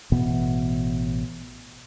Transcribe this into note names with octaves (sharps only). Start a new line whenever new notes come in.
A1 B2 E3 B3